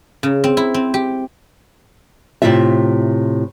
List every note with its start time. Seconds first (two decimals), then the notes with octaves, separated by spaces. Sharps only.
0.23 C#3
0.44 C4
0.57 E4
0.74 C4
0.94 G4
2.42 A2 C3 F#3 G#3 F4 E5